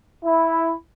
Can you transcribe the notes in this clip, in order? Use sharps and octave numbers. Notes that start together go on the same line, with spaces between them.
E4